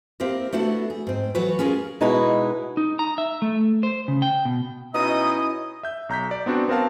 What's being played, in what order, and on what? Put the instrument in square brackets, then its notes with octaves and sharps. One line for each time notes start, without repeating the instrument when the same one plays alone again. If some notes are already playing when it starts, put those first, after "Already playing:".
[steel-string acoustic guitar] A#3 C4 E4 G4 A#4
A3 B3 D4 E4 F#4 A4
G#4
G#2 C4
E3 F#3 F#4 A4 B4 C#5
C#4 F4 G#4 A#4
B2 G#3 D#4 E4 F#4 B4
[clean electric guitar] D#4
A#5
E5
A3
C5
C#3
G5
B2
[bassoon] B2 [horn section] C#4 E4 D#5 [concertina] D#4 [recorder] D#6
[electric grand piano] E5 G6
B1 A#5 G6 B6
D5
B3 C4 D4 F#4
B3 C4 A#4 F5 A5